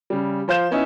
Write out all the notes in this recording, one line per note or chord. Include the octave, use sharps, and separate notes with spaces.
C#3 G3
F3 C5 F5 G6 E7
B3 C#4 D#4 E4